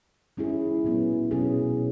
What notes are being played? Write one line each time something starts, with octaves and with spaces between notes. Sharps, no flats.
G#3 C#4 E4 G#4
A#2 F#3 B3
B2 F#3 C#4 G#4